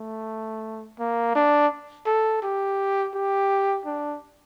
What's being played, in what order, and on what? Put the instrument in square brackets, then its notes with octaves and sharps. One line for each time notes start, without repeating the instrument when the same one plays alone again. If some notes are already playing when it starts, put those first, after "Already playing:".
Already playing: [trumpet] A3
A#3
D4
A4
G4
G4
D4